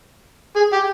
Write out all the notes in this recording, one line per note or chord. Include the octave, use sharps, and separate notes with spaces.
G#4
G4